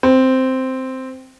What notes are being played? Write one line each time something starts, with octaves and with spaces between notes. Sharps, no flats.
C4